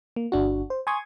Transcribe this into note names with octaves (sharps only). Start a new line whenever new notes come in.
A#3
G1 D4 F#4
C5
G#5 C6 C#6 D#6 G#6